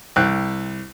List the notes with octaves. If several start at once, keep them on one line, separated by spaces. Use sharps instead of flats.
C2 G5 F#6